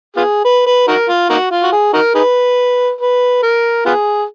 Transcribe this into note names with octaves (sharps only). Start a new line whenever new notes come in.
B3 F4 G#4
B4
B4
D#4 F#4 A#4
F4
A#3 D#4 F#4
F4
F#4
G#4
D#4 F#4 A#4
D#4 G#4 B4
B4
A#4
B3 F4 G#4